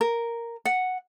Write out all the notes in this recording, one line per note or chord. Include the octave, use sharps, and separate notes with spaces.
A#4
F#5